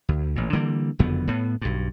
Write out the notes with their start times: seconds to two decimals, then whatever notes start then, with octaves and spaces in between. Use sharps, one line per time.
0.09 D2
0.36 A1 A#2
0.53 D3 E3 G3 A#3
0.99 F#1 F2 D3 B3
1.28 A2 B3
1.61 B1 G2